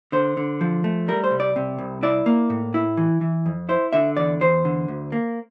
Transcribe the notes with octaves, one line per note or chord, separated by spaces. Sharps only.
D3 C5
D3
F3
A3
G3 A#4
C5
C2
D5
C3
C2
E4 D5
A#3
A2
E4
E3
E3
F2
E4 C5
D3 E5
E2 D5
E2 C5
D3
D2
A#3